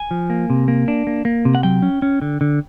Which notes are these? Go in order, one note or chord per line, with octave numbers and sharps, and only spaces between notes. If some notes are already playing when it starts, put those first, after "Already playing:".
Already playing: G#5
F3
A#3
C3
A#3
D4
A#3
A#3
C3
F#5
F#3 G5
C#4
C#4
D3
D3